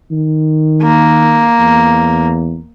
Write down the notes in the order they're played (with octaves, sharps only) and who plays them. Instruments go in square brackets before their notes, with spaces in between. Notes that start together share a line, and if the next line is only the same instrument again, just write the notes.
[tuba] D#3
[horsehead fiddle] A#3
[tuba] E2